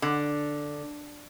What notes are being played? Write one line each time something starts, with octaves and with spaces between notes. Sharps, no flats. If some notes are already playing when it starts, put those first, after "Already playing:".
D3